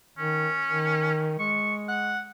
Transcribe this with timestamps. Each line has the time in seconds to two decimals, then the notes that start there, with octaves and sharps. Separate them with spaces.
0.18 D#3 C#4
0.67 D#3
1.39 G#3 C#6
1.88 F#5